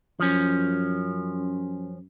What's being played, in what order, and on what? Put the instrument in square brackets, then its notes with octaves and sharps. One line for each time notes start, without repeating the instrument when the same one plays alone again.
[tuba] F#2 [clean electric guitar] F3 C#4